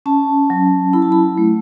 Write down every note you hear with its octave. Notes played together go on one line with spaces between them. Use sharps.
C#4 A5
F#3
E4 B5
A5
B5
A3